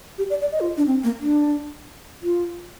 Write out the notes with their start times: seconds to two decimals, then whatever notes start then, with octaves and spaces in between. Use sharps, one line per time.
0.18 G4
0.30 D5
0.41 D5
0.52 D#5
0.60 F4
0.77 D4
0.87 C4
1.04 A#3
1.20 D4
2.23 F4